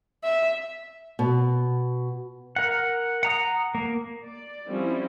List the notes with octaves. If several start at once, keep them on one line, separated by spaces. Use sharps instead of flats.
E5
B2
A#4 F#5
F#5 A#5 D#6
A#3
D5
F3 G3 C4 C#4 E4